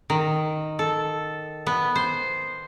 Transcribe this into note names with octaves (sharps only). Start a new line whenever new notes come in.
D#3
A4
B3
C5